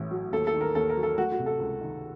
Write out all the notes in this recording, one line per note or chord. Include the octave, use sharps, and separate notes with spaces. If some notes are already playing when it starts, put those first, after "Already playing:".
Already playing: A1 A2
F#3
D#2 A4
A4
D#3
A#4
D#2 A4
A#4
F#3
A4
A3 F#4
F#4
C3
A4
C#2
D#3